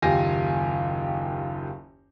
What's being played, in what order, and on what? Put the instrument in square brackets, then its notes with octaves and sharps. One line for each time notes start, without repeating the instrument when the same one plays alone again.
[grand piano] F#1 D#2 F4 G4 G#5 A#6